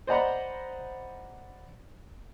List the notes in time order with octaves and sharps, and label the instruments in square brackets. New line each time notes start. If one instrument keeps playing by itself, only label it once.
[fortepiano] C5 D5 D#5 F#5 A#5 B5